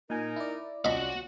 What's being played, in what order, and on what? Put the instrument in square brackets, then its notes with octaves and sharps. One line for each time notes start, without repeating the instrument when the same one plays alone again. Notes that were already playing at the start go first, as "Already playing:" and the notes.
[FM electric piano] A#2 G#5 [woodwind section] D#4 A#4
[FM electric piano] E4 D5
[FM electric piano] C2 C#4 [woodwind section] F4 D5 [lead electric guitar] F#4 F#5 [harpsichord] D#5 B5